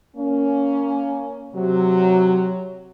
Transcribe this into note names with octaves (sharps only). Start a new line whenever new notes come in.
A#3 C#4
C3 F#3